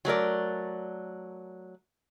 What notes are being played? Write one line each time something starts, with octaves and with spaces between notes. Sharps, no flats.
F#3 A3 A#4 D5